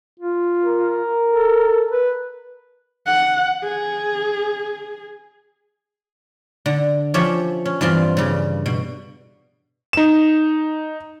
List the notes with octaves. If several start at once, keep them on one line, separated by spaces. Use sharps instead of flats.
F4
A#4
A4
B4
F#5
G#4
D3
F3 C#4 G4 C#5 E5
C#4
G2 E3 C4 F4
G2 C#3
B2
D#4 E7